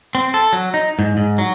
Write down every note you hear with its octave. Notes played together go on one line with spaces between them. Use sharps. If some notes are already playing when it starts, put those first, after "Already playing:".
C4
A4
F#3
D#4
G#2
G#2
F#3